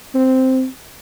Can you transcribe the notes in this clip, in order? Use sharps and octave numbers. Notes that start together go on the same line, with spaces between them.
C4